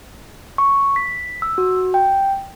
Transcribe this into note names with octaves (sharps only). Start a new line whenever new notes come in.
C#6
B6
E6
F#4
G5